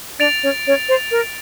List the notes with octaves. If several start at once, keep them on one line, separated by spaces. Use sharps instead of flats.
D4 D5 A6 D7 F7
C#4 C#5
C#4 C#5
C5
A#4